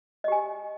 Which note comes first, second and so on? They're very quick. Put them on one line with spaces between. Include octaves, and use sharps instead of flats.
D#5 G4 G#5